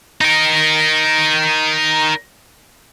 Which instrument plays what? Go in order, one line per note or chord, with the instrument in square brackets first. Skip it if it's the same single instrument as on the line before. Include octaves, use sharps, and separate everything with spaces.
[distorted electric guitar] D#4 A#4